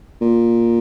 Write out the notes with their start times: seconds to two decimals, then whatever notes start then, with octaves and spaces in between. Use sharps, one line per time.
0.21 A#2